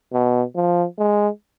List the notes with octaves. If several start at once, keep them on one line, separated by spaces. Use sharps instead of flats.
B2
F3
G#3